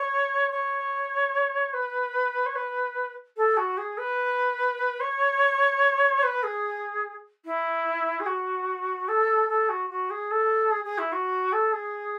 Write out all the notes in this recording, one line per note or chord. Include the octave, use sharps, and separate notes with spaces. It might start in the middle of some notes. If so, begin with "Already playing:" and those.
Already playing: C#5
C#5
B4
C#5
B4
A4
F#4
G#4
B4
C#5
B4
G#4
E4
G#4
F#4
A4
A4
F#4
F#4
G#4
A4
G#4
G#4
E4
F#4
A4
G#4